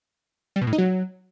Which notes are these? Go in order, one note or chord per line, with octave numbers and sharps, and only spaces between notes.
G3
B2
A2
D#4
F#3